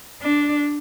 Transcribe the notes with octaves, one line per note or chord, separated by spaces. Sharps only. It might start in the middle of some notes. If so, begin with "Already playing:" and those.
D4